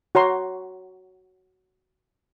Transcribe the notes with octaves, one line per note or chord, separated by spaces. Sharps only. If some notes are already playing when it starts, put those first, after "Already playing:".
F#4 C#5 A#5 C6